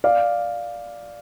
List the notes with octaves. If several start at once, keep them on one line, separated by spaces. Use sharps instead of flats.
D5 F5